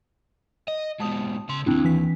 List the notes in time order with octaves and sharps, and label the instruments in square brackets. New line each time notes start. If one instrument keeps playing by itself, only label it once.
[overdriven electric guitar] D#5
[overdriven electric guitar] G#2 B2 [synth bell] A5 D#6
[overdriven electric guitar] C#3 C6
[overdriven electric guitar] D#2 G#2 [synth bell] C4 D4 E4
[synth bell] E3 B6